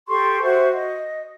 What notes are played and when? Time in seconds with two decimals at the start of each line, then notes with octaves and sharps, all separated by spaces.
0.08 G4 A4 C6 C#6
0.41 F#4 C5 E5 C#6
0.73 D#5